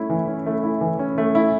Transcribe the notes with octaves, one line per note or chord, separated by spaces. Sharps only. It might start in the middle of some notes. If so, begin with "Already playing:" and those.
Already playing: A3 C#4 E4
E3
C#4
A3
E4
E3
C#4
A3
E4